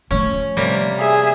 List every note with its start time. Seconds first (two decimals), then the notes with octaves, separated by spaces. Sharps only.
0.11 F3 A3 C#4
0.57 C3 G3 A#3
0.99 G#4 E5